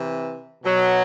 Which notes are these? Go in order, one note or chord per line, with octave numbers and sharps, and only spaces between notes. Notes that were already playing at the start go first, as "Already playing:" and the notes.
Already playing: C3 E3
B2 F#3